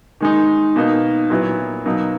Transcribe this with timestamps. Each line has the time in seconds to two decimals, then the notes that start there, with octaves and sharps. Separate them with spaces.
0.21 D#3 G#3 D#4
0.76 B2 A#3 D#4
1.30 A#2 F#3 B3 E4
1.86 B2 F#3 A#3 D#4